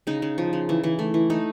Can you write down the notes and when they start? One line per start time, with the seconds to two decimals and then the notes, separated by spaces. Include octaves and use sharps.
0.07 C#3 D#4
0.22 C#3
0.38 F3
0.53 C#3
0.69 E3
0.84 E3
0.99 A3
1.14 E3
1.30 A3 D#4